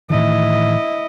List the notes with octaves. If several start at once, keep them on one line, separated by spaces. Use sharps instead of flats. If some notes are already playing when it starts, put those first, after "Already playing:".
A2 D#3 E3 E4 D#5